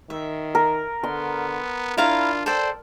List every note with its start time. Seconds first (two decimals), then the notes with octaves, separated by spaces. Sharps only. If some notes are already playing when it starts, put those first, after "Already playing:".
0.10 D#3 E5
0.55 A#4
1.04 D3 B3 C6
1.98 D4 E4 F4 F5 A#5
2.46 A4 C5 D5 G5